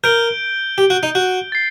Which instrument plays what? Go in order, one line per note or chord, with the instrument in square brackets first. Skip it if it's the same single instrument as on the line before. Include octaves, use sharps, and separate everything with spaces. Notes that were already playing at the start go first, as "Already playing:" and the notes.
[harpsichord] A#4 [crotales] G6 D7 G7
[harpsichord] G4
F#4
D#4
F#4
[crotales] A6 C7